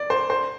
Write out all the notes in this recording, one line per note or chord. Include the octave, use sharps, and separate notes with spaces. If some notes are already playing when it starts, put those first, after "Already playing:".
Already playing: D5
C5
C5